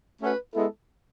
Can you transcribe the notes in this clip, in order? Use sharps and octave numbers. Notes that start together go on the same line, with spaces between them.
A3 C#4 F#4 B4
G#3 B3 E4 A4